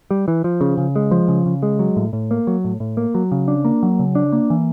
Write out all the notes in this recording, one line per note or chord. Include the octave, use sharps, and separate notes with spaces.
G3
E3
F3
C#3
C#3
G#3
F3
C#3
C#3
G#3
F#3
A2
A2
A#3
F#3
A2
A2
A#3
F#3
C#3
D4
A#3
F#3
C#3
D4
A#3
E3